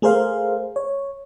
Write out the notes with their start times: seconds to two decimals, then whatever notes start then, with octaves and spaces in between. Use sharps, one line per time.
0.02 A3 G#4 A#4 C5 F5
0.76 C#5